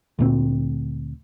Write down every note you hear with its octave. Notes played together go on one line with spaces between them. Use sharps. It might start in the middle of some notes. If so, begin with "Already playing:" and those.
D2 A#2 C4